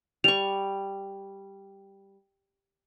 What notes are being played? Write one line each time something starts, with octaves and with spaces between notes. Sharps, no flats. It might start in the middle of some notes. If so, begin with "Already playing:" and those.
G3 C#6 F7